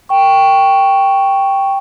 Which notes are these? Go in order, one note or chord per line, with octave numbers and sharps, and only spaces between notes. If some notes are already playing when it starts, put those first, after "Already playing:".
G5 C#6